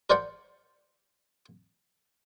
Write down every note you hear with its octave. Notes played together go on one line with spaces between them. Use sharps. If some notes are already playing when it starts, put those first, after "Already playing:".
A#4 C5 D5 F#5 G5